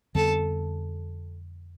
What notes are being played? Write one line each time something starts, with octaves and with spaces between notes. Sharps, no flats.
F2 D3 G3 B3 A4